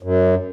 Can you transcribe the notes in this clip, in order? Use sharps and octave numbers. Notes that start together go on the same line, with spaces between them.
F#2